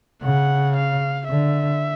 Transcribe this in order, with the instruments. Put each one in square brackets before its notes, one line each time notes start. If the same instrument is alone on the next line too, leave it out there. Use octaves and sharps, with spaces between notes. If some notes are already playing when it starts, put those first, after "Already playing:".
[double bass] C#3 [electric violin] F#5
[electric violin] F5
[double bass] D3 [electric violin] E5